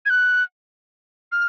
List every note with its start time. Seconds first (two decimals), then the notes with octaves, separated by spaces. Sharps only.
0.06 G#6
0.10 F#6
1.32 F6